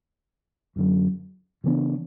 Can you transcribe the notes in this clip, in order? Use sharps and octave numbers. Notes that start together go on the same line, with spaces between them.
F#2 D3 F#3
C#3 E3 B3 D4